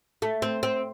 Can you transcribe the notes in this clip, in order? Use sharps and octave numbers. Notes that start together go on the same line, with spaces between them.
A3
C4
C4